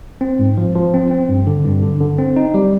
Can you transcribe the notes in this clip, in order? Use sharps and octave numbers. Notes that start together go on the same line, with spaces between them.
C4
G#2
F3
F3
C4
C4
G2
D3
G2
D3
D3
C4
D#4
G3